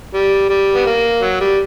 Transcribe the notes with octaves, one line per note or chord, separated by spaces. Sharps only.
G3
G3
B3
A#3
F#3
G3